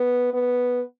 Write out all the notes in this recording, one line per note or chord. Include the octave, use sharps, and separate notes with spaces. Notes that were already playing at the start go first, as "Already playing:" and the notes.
Already playing: B3
B3